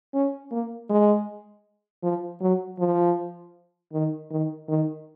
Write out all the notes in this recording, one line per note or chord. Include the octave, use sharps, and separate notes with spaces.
C#4
A#3
G#3
F3
F#3
F3
D#3
D#3
D#3